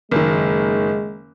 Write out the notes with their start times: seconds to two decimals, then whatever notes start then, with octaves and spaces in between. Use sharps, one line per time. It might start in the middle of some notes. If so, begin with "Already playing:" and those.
0.11 F#1 D#3 G#3